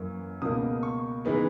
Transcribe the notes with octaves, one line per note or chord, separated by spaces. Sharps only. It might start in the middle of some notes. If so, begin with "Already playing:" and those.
Already playing: F#2 E3 A#3
C#2 B2 A#3 D#6
C#6
C#3 E3 G#3 B3 D#4